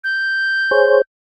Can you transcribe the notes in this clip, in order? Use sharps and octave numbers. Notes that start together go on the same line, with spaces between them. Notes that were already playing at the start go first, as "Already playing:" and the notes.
G6
G#4 C5 C#5